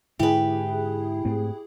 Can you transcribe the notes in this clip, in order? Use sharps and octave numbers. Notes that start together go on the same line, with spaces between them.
G#2 D3 E4 G4 G#4 B4
G#2 A3 C4